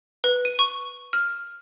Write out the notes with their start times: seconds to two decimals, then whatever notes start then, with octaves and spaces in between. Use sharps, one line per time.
0.24 B4
0.45 D#7
0.59 C#6
1.13 F6